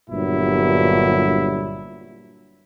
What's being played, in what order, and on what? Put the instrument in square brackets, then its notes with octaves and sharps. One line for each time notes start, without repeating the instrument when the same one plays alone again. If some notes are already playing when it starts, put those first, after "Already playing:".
[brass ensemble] G1 G2 A#2 F#3 E4